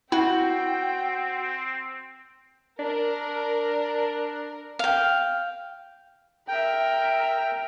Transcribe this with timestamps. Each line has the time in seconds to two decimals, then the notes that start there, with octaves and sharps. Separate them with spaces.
0.12 C4 E4 F#4 G5
2.79 D4 A#4
4.79 F5 G5
6.48 A#4 E5 G5